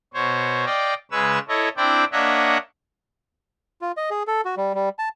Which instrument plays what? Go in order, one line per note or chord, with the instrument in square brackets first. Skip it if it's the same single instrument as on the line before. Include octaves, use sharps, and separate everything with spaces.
[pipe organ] B2 C5 C#5
D5 D#5 F5 G5
C#3 G#3 B4 C#5 E6
E4 A4 C#5 D#5
C4 D4 E4 C5 D5 G5
A#3 D4 C#5 D#5 E5 F#5
[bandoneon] F4
D#5
G#4
A4
F#4
G3
G3
A5